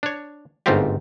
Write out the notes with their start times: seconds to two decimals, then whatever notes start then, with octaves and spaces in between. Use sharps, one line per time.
0.03 D4 C#5
0.66 G1 G#2 A3 C4 F4 G4